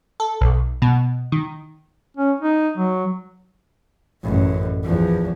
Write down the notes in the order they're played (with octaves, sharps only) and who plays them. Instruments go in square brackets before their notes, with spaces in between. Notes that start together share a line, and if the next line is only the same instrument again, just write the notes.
[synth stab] A4
B1
B2
D#3
[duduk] C#4
D#4
F#3
[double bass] A1 F#2
E2 F3